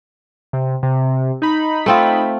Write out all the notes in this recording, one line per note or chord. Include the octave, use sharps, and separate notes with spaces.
C3
C3
D#4 B5
A3 C4 F4